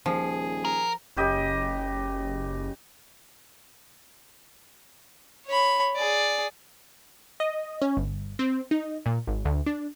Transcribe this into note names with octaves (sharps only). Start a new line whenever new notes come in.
D#1 F3 G#4
A#4
F#1 C#3 G4 D#5
C#5 B5
G#4 D5
D#5
C#4
G1
C4
D#4
A#2
G#1
D2
D4